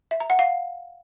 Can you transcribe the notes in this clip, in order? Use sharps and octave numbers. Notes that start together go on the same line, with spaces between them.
E5
A#5
F#5
F5